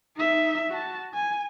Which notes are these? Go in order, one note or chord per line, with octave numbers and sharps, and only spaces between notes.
D#4 E5
F#4 A5
G#5